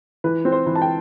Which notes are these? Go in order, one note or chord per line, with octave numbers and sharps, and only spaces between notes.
E3 B4
C4
C5
E3
A5
G5